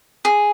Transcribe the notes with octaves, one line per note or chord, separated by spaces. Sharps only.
G#4